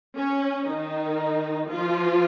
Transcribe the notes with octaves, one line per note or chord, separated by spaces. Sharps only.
C#4
D#3 D#4
F3 F4